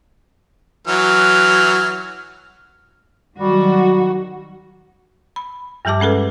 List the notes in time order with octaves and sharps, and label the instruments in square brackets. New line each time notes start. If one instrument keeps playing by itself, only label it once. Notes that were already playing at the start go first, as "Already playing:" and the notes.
[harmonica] E3 F#3 F6
[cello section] D#3 F#3 F#4 [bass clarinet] G3
[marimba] B5
G2 F3 G3 G4 A5 D6
G#3 C#4 G#4 A4 B4